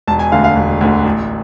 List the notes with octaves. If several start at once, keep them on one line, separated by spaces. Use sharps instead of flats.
E1 A5
G#5
D2 D3 F5
F5
E1
D2 D3
A1